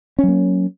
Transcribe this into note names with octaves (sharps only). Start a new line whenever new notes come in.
F#3 A#3 C#4